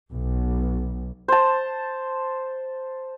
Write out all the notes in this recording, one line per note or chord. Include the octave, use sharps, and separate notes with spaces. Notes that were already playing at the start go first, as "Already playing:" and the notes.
B1
C5 A5